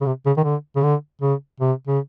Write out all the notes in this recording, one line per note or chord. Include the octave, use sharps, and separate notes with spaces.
C#3
C3
C#3
D#3
D3
C#3
D3
C#3
C3
C#3